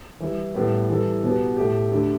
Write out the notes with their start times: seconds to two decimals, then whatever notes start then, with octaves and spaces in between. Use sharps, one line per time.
0.20 E3 G3 E4
0.54 A2 G3 B3 G4
0.89 E3 G3 E4 A4
1.23 B2 B3 G4
1.57 A2 A3 G4
1.91 D2 D3 A3 G4